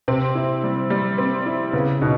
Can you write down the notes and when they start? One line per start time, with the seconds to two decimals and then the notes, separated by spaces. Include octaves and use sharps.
0.08 C3 C4
0.35 E4
0.64 G3
0.90 G3
1.18 C4
1.46 E4
1.73 C#3 B3
2.01 B2 D#4